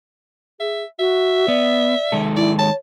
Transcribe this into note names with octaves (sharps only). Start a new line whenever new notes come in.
G#4 E5
F#4 E5
B3 D5
D#3 G#3 A4
E4 D5
C#5 A5